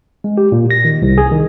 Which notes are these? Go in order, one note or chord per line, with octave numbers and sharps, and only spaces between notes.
G#3
G4
A#2
A#6
D#3
C2
G#4
D#3